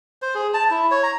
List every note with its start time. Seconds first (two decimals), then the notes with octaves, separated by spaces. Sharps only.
0.22 C5
0.35 G#4
0.54 A5
0.71 E4
0.91 C#5
1.03 A#5